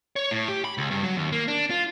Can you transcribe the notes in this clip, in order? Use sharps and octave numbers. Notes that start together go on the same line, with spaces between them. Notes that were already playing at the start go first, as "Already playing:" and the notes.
C#5
A2
G4
B5
C#2
G2
F#3
D#2
A#3
D4
F4